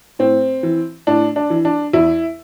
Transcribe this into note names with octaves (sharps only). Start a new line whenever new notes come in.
A2 C4
E3
A2 D4
D4
E3
D4
E2 E4